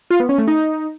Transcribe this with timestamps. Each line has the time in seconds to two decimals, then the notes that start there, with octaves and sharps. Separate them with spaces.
0.10 F4
0.20 B3
0.29 C#4
0.38 A3
0.48 D#4